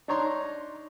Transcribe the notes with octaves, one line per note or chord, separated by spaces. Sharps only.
D4 D#4 C#5 A#5 C6